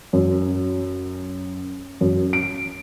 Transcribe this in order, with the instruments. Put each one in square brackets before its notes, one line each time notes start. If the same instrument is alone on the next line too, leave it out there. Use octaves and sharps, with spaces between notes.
[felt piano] F#2
F#2
D7